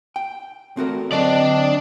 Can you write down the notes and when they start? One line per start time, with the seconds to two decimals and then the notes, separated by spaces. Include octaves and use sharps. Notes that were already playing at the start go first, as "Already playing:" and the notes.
0.16 G5
0.77 A3 C4 F#4 A#4
1.12 D3 F#3 C4 D4 D5 D#5